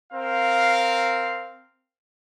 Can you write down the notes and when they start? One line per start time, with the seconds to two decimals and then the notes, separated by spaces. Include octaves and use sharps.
0.13 C4 A#4 F5